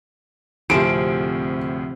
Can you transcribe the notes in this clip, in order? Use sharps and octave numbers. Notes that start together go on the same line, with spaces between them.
D2 A2 C3 F3 C4 G#4 D7